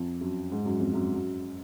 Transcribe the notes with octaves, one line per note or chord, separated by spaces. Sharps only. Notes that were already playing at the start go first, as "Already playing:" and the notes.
Already playing: F2
F#2
G#2
F#2
F2
F#2
F#2